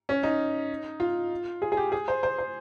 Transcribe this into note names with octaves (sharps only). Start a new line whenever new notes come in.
C#4
D#4
F4
G#4
G#4
G4
G#4
C5
C5
C5